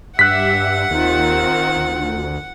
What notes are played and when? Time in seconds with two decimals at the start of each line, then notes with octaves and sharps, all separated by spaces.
0.19 G2 G4 E5 F#5 F#6 B6
0.91 D#2 D#3 C4 F4
1.76 D2